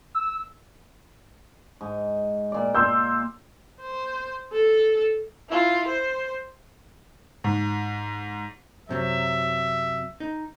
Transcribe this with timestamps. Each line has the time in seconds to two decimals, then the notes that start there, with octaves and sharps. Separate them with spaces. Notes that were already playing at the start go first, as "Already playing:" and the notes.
0.15 E6
1.81 G#2
2.52 A#2 D5
2.75 C6 E6 G6
3.81 C5
4.53 A4
5.49 E4 F4
5.88 C5
7.44 G#2
8.89 F#2 C3 F#3 E5
10.20 D#4